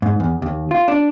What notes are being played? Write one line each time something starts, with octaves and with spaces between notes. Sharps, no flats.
G#2
E2
D#2
F4
D4